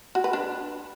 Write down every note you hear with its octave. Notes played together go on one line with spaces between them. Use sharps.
F#4
B4
D4